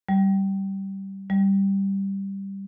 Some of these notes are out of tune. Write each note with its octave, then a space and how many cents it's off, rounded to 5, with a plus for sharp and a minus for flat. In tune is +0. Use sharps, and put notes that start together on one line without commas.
G3 -15
G3 +0